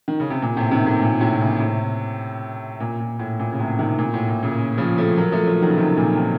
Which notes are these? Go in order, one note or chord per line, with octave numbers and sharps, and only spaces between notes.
D#3
C#3
C3
A#2
A2 C3
C3 D#3
A2 C3
A#2
A2 C3
A#2 C#3
A2 C3
A#2
A#2
A2
A#2
C#3
A2 C3
C3 D#3
A#2
A2
A#2
A#2 C#3
C#3 F3
F3 A3
F#3 A#3
F3 A3
F3 A3
D#3 F#3
C#3
C3 D#3
A#2 C#3
C3 D#3